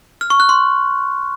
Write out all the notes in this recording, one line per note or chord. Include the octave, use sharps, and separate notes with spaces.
F6
C#6
F#6
C6